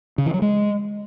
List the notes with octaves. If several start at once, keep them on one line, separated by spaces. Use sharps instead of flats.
C#3
E3
F#3
G#3